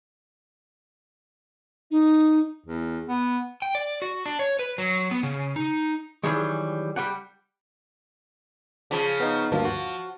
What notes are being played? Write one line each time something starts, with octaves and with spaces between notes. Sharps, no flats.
D#4
E2
B3
G5
D5
F#4
D4
C#5
B4
F#3
B3
C#3
D#4
D#3 E3 F#3 G3 G#4
G3 G4 F#5
C#3 F3
B3 D#4
D2 G2 F3 A#3
F#4